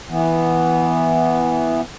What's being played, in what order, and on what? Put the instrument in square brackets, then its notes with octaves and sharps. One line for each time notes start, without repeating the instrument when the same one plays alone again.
[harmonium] E3 B3